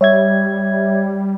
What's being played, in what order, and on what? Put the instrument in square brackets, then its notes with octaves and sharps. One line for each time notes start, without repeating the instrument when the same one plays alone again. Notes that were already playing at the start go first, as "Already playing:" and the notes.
[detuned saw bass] G3 [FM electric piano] C#5 E5 G#6